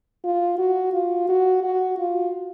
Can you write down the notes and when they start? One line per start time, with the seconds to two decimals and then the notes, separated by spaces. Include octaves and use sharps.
0.24 F4
0.58 F#4
0.93 F4
1.29 F#4
1.63 F#4
1.98 F4